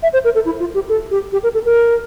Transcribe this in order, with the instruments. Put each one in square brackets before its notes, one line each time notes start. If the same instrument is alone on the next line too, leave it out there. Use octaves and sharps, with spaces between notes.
[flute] E5
C5
A#4
A4
E4
F4
G4
A4
G4
G4
A#4
A4
A#4